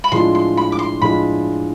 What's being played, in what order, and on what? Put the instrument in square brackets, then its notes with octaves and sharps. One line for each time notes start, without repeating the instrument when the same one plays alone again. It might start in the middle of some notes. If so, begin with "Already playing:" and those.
[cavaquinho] B5
[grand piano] A2 F3 G#3 D4 F4 [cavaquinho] C6
[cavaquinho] C6
B5
D6
C6
[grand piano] A2 F3 G#3 D4 F4 [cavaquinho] B5